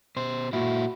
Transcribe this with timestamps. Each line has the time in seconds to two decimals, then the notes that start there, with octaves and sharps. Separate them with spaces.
0.17 B2 C5
0.53 A#2 E4 F#4